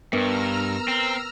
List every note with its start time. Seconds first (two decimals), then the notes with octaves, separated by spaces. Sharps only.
0.13 G2 B3 A#4 B4 A#5 E6 F6
0.88 C4